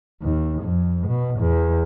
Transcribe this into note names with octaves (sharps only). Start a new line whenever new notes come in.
D#2
F2
B2
E2